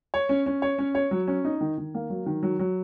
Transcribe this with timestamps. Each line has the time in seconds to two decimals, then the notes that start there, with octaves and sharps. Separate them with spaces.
0.14 C#5
0.29 C#4
0.46 C#4
0.62 C#5
0.78 C#4
0.95 C#5
1.11 F#3
1.28 C#4
1.45 D#4
1.61 D#3
1.78 D#3
1.94 A#3
2.10 F#3
2.26 D#3
2.43 F#3
2.59 F#3